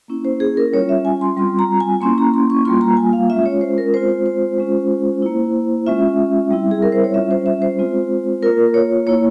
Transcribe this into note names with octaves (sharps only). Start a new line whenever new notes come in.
A#3 C#4 E4
C5
G#4
A#4
G3 C#4 F4 C#5
E5
G#5
C6
G3 C4 F4 C6
A#5
G#5
A#3 C#4 E4 C6
A#5
C6
C#6
G3 A#3 F4 C6
A#5
G#5
F5
G#3 C#4 F4 E5
C#5
C5
A#4
G#3 C4 F4 C5
C5
G#3 C#4 F4
A#3 E4
G#3 C#4 F4 E5
G3 C4 E4
G#4
A#4
C5
C#5
G3 C#4 F4 E5
C5
E5
C5
G#3 C4 F4
A#3 F4 A#4
C#5
A#3 E4 C#5